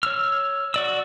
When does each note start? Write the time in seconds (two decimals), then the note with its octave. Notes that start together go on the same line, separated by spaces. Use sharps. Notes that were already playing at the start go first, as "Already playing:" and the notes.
0.03 C#5 E6 F6
0.74 F#4 D5 E6